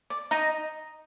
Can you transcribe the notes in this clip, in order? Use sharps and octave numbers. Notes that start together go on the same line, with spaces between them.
D5
D#4 D#5